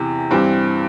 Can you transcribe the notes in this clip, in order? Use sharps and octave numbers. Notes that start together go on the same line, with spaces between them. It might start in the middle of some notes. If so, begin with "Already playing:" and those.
Already playing: E2 C3 E3
G2 E3 C4 G4